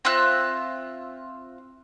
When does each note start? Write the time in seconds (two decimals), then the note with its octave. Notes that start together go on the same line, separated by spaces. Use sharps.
0.05 C4 F4 E5 F#6